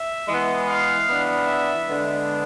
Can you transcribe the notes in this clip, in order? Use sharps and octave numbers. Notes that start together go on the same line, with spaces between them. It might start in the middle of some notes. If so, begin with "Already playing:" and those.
Already playing: E5
E3 G#3 B3
F5
E3 B3 D4
E5
D3 G#3 B3 D4